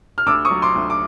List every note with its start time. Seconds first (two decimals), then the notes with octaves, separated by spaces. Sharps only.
0.18 F6
0.26 D2 D6 E6
0.45 C#6 D#6
0.51 F#3
0.62 C6 D6
0.75 D2
0.90 D6